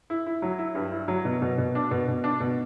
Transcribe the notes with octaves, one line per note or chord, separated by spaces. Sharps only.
E4
E4
F#3
E4
G2
E4
F#3
B2
B2
B2
D4
B2
B2
D4
B2